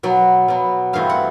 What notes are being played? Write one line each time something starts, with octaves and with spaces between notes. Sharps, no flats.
B2 F#3 B3
B2 F#3 B3
G2 E3 A3 C4 F5
F#5